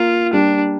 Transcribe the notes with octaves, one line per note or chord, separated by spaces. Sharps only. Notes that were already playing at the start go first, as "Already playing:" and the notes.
Already playing: A#3 F4
G3 D4